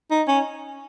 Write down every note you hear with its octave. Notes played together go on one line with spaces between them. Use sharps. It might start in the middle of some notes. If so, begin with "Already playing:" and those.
D#4
C#4